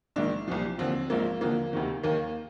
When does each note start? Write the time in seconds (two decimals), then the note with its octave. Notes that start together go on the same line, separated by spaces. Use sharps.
0.16 A#1 G#2 D#3 D4
0.48 C2 A#2 F3
0.78 D#2 D3 F3 C4
1.10 A#1 G#2 F3 A#3
1.41 D#2 D3 F3 A#3
1.73 D2 C3 D#3
2.03 D#2 D#3 A#3